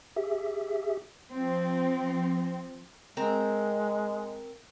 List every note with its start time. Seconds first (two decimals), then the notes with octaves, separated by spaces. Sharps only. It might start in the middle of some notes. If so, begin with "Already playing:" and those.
0.16 G4 G#4 E5
1.33 F3 C4
3.17 G#3 C4 A#4